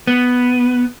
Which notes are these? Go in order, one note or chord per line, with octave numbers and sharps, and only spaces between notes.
B3